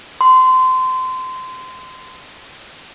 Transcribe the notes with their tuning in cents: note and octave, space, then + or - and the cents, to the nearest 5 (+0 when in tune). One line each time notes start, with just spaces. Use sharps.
C6 -25